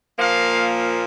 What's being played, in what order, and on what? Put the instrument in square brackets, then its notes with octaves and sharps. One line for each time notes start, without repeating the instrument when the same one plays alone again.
[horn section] A#2 F3 A#3 F5